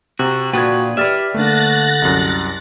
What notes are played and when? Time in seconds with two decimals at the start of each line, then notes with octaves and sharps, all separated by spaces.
0.19 C3 F#4
0.53 A#2 D4 F#4 B4 G5 D#6 G#6
0.97 G4 B4 D5 E5 F6 A6
1.34 D3 A3 A#3 D4 F#6 A6 A#6
2.02 C2 F#2